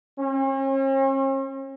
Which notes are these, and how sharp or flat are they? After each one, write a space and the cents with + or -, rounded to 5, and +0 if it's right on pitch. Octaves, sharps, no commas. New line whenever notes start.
C#4 -45